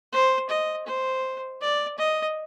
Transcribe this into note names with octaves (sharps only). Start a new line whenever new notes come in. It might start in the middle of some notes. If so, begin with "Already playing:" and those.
C5
D#5
C5
D5
D#5